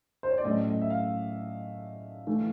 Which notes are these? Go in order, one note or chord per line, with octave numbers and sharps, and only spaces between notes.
C5
C#5
D5
A2 F#3 A3 C#4 D#5
D#5
E5
F5
E3 A3